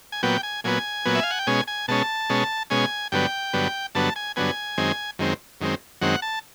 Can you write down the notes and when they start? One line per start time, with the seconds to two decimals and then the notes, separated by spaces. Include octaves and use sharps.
0.12 G#5
0.23 A#2 F#3 B3 G5
0.43 G#5
0.64 A#2 F#3 B3 G#5
1.05 A#2 F#3 B3
1.15 E5
1.23 F5
1.31 F#5
1.39 G5
1.47 B2 G#3 C#4 G#5
1.68 G#5
1.88 B2 G#3 C#4 A5
2.30 B2 G#3 C#4
2.70 B2 G#3 C#4 G#5
3.12 G2 D3 F#3 B3 G5
3.53 G2 D3 F#3 B3
3.95 G2 D3 F#3 B3 A5
4.16 G#5
4.36 G2 D3 F#3 B3 G#5
4.78 F#2 D#3 G#3 C4
5.19 F#2 D#3 G#3 C4
5.61 F#2 D#3 G#3 C4
6.01 F#2 D#3 G#3 C4 F#5
6.22 A5